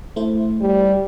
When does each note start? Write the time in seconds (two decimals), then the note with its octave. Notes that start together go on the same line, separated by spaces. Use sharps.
0.16 A3 E4 C5
0.61 G3